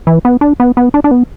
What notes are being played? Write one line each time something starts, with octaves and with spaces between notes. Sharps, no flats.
E3
B3
D4
B3
B3
D4
D4
B3